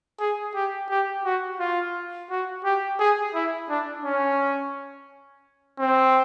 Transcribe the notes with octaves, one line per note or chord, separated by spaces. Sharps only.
G#4
G4
G4
F#4
F4
F#4
G4
G#4
E4
D4
C#4
C4